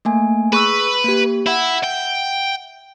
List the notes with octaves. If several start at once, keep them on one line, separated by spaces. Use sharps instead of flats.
A3 A#3 G#5
G#4 B4 C#6 E6
A#3 G4
E4 E5 F#5
G5